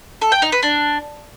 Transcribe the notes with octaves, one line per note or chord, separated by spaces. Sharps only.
A4
G5
D#4
B4
D4